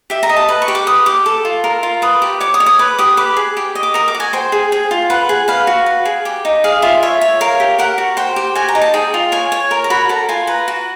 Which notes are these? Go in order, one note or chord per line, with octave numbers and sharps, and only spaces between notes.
G4 E5
A#5
D#5
A5
B4
C#6
G4
D6
B4 D#6
G4 D6
A4
F4
A#4
F4
B4 D#6
G4
C#5 D6
D#6
C#5
D#6
B4 D6
G4 D#6
B4 D6
G#4
G4
D#5
D6
A#4 D#6
D6
F#4
G#5
C5 G5
G#4
G#4
F4
B4 F#5
G#4
B4 F5
F#4
B4
G#4
G4
D#4
G#4 F5
F4 E5
C#5 E5
C#5
A#4 F5
G4
A#4 F#5
F#4
C5 G5
G4
F#4 G#5
A#5
D#4
A5
G#4 G5
F4
C#5 G#5
C#5
A#4
A#5
F#4 B5
A4 A#5
F4 G#5
B4 A#5
F#4